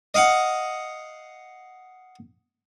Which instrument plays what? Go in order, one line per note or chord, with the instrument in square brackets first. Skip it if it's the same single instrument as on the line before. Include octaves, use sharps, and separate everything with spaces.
[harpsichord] D#5 F5 F#5